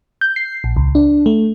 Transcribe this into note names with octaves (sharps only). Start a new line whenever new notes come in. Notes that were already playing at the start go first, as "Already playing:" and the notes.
G6
C7
A#1
C#2
D4
A3